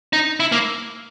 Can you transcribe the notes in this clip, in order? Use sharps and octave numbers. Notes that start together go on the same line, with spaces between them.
D#4
E4
A#3